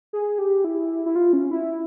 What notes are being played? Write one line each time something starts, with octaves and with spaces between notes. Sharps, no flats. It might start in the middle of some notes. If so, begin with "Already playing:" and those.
G#4
G4
E4
E4
F4
C#4
E4